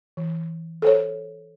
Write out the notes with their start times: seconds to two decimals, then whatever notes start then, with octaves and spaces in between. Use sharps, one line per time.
0.17 E3
0.82 A4 C5 C#5